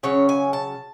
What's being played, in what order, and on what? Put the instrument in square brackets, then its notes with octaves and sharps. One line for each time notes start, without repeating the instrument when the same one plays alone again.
[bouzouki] C#3 F#3 C#4 C#5
G#5
A5